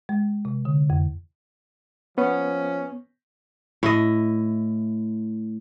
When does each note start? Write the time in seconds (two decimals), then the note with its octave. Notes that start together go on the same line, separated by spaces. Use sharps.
0.09 G#3
0.45 C3
0.65 D3
0.90 F2
2.18 F3 B3 C#4
3.83 A2 E4 D#5